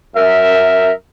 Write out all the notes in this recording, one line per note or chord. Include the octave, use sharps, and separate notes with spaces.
F#2 A#4 E5